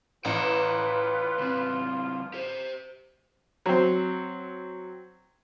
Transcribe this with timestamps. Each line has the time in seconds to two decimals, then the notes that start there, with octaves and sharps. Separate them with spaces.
0.25 A1 F4 B4 G5 A#5
1.38 C#2 C4
2.34 G4 C5
3.66 F#3 C4